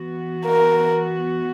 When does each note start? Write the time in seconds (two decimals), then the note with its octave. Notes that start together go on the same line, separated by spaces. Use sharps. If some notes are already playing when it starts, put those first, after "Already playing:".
Already playing: E3 B3 F#4
0.46 A#4